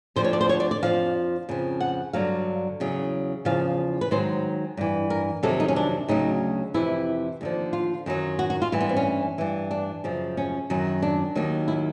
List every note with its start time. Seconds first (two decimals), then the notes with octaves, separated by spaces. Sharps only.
0.16 D2 D3 F3 C5
0.24 C#5
0.33 D5
0.41 C5
0.49 C#5
0.60 D5
0.71 D5
0.83 F2 C#3 F3 F5
1.49 F2 C#3 F3
1.80 F#5
2.13 G2 D3 F#3 F5
2.80 E2 C#3 F#3
3.45 E2 C#3 F3 F5
4.01 B4
4.11 G#2 D#3 F#3 C5
4.77 G2 E3
5.10 A#4
5.43 F2 C3 D#3 F#3 A4
5.60 D#4
5.68 C#4
5.76 D4
6.08 D2 C#3 F#3 D#4
6.74 F2 C3 E3 E4
7.41 D#2 D3 F3
7.73 F4
8.06 F#2 D#3 F#3
8.39 F#4
8.50 F#4
8.62 F4
8.72 G2 E3 E4
8.81 B3
8.89 C4
8.96 C#4
9.38 G2 E3
9.71 D4
10.04 F#2 C#3 F3
10.37 C#4
10.70 F#2 D#3 F#3
11.02 D4
11.35 D#2 D#3 F#3
11.68 E4